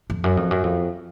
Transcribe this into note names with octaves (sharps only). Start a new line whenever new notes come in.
F2
F#2
F2
F#2
F2